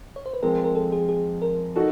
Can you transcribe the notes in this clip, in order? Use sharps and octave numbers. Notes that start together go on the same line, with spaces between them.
C#5
C5
B4
F3 G#3 C4 A#4
A#4
A4
G#4
G#4
A#4
D#4 F#4 A4